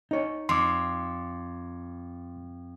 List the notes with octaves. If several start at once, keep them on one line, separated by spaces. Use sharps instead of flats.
D#4 C#5
F2 C6 D6